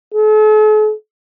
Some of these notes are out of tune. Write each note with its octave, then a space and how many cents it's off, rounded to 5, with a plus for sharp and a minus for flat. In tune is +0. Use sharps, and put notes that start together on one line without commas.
A4 -45